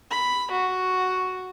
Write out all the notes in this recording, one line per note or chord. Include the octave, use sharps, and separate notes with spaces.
B5
F#4